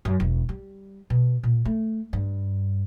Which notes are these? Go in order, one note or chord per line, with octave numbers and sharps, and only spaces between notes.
F#2
E1
G3
B2
A#2
A3
G2